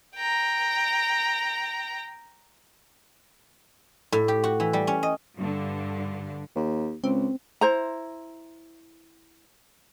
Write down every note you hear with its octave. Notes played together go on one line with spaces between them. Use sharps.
G5 A#5
A2
G4
F#4
E3
G3
C#4
D#5
G2 D3
D#2
C#2 C4
E4 C5 A#5